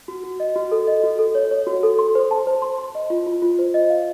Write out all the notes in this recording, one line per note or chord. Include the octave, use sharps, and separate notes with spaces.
F#4
F#4
D#5
F#4
A4
D#5
F#4
A4
C#5
C#5
F#4
A4
C6
C5
A5
C5
C6
C6
D#5
F4
F4
F4
C5
D#5
F5